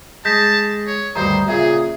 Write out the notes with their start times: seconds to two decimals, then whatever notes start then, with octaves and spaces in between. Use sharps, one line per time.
0.25 G#3 A5 G6 A#6 B6
0.87 C#5
1.15 D2 G2 D#3 C5 A#5
1.48 A#2 C#3 G#4 E5